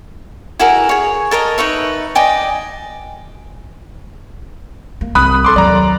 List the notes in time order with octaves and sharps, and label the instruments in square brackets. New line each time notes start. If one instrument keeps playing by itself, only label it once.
[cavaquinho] E4 F#4 G#4 A#4
G#4 C#5
A4 A#4 C#5 D#5
D#4 B4 C#5 E5
D5 D#5 G5 G#5
[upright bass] A#3
[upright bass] C2 [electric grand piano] B5 D#6 F#6
[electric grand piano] A4 C6 D6
[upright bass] D#2 F#3 [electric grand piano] D5 A#5